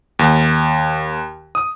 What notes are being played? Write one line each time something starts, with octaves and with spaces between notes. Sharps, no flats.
D#2
D#6